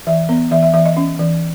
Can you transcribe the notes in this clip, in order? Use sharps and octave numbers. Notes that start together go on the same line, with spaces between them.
E3 E5
B3
E3 E5
E5
E3 E5
D#5
C#4
E3